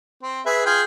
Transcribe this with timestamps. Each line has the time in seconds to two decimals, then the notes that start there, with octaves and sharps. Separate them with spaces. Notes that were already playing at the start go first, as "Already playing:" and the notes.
0.23 C4
0.46 G#4 B4 E5
0.66 F4 G#4 G5